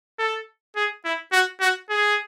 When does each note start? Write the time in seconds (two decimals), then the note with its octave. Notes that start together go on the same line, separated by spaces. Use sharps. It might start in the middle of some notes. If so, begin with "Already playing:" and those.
0.19 A4
0.76 G#4
1.05 E4
1.32 F#4
1.61 F#4
1.90 G#4